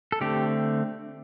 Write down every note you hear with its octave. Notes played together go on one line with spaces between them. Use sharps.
A4
D3 A3 C4 G4